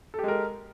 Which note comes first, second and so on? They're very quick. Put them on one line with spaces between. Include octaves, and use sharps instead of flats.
A4 G4 G#3 A#4